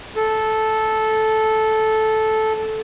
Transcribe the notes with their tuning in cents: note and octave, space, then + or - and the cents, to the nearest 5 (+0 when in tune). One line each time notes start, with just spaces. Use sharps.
A4 -10